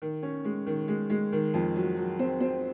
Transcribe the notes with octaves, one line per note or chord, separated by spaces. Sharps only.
D#3
C#4
G#3
D#3
G#3
G#3
D#3
F2
F#3
F#3
C4
C4